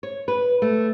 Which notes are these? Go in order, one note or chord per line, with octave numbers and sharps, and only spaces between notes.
C#5
B4
A3